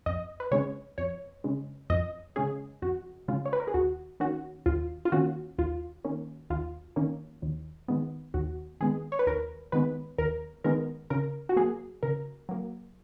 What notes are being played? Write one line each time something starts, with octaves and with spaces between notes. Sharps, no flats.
F2 D#5
B4
C#3 G#3 C#4 C#5
F2 C#5
C#3 G#3 C#4
F2 D#5
C#3 G#3 C#4 G#4
F2 F#4
C#3 G#3 C#4 F4
C#5
B4
A#4
G#4
D#2 F#4
D#3 A#3 C#4 F#4
D#2 F4
F4
D#3 A#3 C#4 F#4
D#2 F4
D#3 A#3 C#4
D#2 F4
D#3 A#3 C#4
D#2
D#3 G#3 B3
D#2 F#4
D#3 G#3 B3 G#4
C#5
B4
D#2 A#4
D#3 G#3 B3 B4
D#2 A#4
D#3 G#3 B3 A#4
C#3 A#4
F#4
F#3 A#3 G#4
C#3 A#4
F#3 A#3